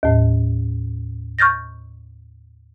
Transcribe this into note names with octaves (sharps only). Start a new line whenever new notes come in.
D#2 A2
C#6 F6 G6 A6 A#6